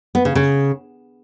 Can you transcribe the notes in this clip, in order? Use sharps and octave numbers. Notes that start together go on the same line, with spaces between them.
B3
C#3
C#3